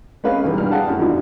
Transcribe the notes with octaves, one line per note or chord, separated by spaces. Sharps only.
G#3 B3 C#4 B4 F5
B1 E2 E3 G3
G2 G3 F6
G4 G#4 D5 F5 F#5 A5
F#2 A2
E2 G#2 B2 F3 D4